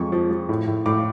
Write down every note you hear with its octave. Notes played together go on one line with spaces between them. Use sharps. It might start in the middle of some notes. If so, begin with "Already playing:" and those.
Already playing: F2 G#3 C#6
F3
F3
A2
A2
A2 D6